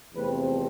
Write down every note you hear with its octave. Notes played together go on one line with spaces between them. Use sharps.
E2 C3 F3 A3 C4 B4